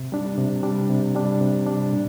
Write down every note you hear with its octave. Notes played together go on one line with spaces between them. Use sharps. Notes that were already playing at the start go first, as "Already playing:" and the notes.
Already playing: C3
G3 D4
C3
G3 D4
C3
G3 D4
C3
G3 D4
A#2